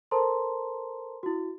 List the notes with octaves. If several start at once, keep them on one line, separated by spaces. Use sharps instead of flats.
A4 A#4 C5 A5 A#5 C6
E4 F#4